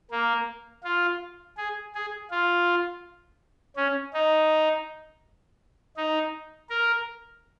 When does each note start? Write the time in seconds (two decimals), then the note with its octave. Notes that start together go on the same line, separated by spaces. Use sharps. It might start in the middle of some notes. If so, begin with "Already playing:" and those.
0.11 A#3
0.84 F4
1.57 G#4
1.95 G#4
2.31 F4
3.77 C#4
4.14 D#4
5.97 D#4
6.70 A#4